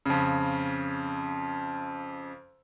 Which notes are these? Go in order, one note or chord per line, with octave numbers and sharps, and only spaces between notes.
F2 C#3